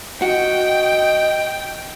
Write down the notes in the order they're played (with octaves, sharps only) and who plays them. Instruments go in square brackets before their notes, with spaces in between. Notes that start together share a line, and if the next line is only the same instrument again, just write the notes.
[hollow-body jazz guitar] F#4 [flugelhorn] D#5 [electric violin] G5